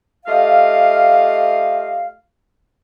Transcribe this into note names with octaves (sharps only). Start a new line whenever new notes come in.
A3 F4 G4 D#5 F5